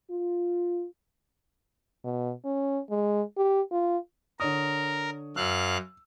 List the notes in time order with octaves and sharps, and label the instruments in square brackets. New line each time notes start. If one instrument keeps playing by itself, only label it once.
[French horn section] F4
[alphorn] B2
C#4
G#3
G4
F4
[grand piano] D3 C#5 D#6 [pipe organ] A#4
[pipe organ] F#2 F5 F#6 [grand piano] E6